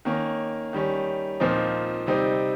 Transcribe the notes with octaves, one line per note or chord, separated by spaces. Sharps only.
D#3 A#3 C#4
D#3 G3 C#4
A#2 F3 C4 D#4
C3 G3 C4 D#4